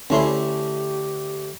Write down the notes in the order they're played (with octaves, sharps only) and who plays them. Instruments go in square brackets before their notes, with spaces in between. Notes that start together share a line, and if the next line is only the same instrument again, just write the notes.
[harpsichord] D2 A3 [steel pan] C#4 E4 C6 [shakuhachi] G4